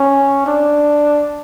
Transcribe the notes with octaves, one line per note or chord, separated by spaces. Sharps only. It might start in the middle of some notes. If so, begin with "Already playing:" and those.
Already playing: C#4
D4